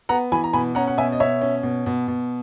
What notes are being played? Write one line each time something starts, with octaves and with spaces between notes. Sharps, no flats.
B3 F#5 A#5
E3 G#5 B5
A#5
B2 G#5 B5
C#4 F#5 A#5
F#5
B2 E5 G#5
D#5
B2 C#5 E5
C#4
B2
B2
B2